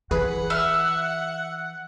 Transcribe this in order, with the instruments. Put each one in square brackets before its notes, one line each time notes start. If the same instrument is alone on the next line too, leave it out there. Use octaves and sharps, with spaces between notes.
[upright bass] E3 [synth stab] G#4 B4 B5 [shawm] F#5
[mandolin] E5 F6